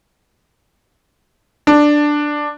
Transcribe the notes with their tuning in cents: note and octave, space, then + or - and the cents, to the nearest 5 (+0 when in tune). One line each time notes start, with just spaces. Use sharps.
D4 +5